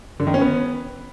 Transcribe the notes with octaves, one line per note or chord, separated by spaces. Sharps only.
D3
D#3
C#4
B3